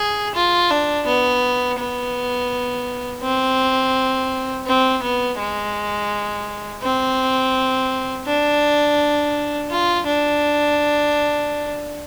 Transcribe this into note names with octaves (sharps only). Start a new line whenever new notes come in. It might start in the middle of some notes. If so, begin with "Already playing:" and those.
Already playing: G#4
F4
D4
B3
B3
C4
C4
B3
G#3
C4
D4
F4
D4